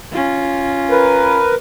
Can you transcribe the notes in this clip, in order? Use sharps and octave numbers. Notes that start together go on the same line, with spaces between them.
C#4 F4
A#4 B4